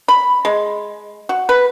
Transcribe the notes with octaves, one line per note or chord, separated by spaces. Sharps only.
B5
G#3
F#4
B4